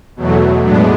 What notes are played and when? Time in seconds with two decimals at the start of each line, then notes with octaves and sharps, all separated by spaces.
0.16 E2 B2 F#3 A3
0.61 A2 G#3 B3 D4